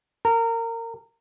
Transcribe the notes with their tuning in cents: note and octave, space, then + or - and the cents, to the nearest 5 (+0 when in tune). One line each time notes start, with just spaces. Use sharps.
A#4 -25